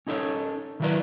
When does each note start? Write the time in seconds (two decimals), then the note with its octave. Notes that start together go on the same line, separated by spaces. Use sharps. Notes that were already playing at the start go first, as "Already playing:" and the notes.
0.07 C#4 D#4 A4 B4 C#5
0.80 D#3 E3 F#3 E4 B4 D5